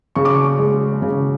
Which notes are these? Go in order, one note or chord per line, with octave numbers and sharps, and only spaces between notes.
C#3 C#6
D6
C#6
G#3
C#3